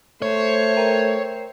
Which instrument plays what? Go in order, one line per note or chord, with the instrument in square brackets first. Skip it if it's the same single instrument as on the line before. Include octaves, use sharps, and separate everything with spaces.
[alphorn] A3 [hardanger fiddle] C5 [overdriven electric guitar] C#5
[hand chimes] A#4 G5 A#5